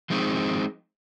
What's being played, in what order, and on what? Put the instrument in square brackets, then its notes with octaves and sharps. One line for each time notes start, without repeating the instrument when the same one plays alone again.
[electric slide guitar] F3 G#3 C4 D#4